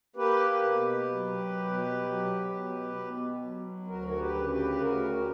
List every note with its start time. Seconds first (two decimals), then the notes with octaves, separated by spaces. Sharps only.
0.16 A#3 G4 B4
0.63 B2
1.10 F#3
1.56 B2
2.02 F#3
2.48 B2
2.96 B2
3.42 F#3
3.87 D2 F#4 A#4
4.08 A#4
4.19 G4 B4
4.34 C#3
4.49 G4 B4
4.80 D2 F#4 A#4
5.17 G4